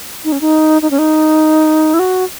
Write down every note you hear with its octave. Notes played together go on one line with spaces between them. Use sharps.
D#4
C#4
D#4
D#4
C#4
D#4
E4
F#4